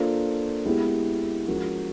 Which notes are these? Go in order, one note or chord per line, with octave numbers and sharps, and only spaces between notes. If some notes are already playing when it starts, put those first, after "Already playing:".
Already playing: A#3 D4 F4 A4 C5
G#3 B3 E4 G4
F3 G#3 C#4 F#4 A#4